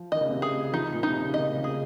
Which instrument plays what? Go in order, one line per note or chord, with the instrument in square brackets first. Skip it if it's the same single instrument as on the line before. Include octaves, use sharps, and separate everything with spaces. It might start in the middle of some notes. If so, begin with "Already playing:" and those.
Already playing: [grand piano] F3
[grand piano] D#3 [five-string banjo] D#5
[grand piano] C#3
C3
[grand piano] C#3 [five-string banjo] G#4
[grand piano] F3 [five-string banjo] D#4
[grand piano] A#2
[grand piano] C3 [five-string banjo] D#4
[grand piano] C#3
[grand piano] D#3 [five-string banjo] D#5
[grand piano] C#3
[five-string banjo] G#4